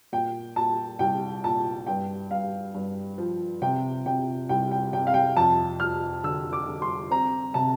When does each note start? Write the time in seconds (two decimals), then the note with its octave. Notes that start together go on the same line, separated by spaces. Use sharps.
0.12 A#2 G5
0.56 A#2 A5
0.99 C2 G5
1.44 A#2 A5
1.87 G2 G5
2.31 G2 F5
2.74 G2
3.18 F3
3.62 C3 G5
4.06 C3 G5
4.49 C2 G5
4.71 G5
4.93 C3 G5
5.07 F5
5.14 G5
5.36 F2 A5
5.80 F3 F6
6.24 D3 E6
6.53 D6
6.67 D3
6.82 C6
7.10 C4 A#5
7.54 C3 A5